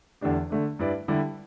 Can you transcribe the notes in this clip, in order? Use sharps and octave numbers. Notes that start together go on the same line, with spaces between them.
E2 D3 A3 D4 G4
D3 A3 D4
G2 G3 E4 B4 D5
D3 G3 E4 G4